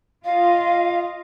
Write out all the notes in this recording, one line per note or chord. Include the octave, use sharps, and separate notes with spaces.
F4 D#5 F5